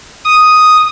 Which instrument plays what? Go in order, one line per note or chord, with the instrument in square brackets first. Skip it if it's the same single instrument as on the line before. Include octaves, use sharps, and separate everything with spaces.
[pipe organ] D#6